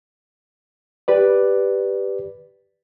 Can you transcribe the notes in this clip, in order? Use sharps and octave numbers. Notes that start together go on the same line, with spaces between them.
G4 B4 D5